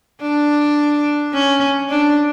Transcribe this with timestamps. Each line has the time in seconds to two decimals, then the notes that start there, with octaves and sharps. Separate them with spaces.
0.21 D4
1.34 C#4
1.89 D4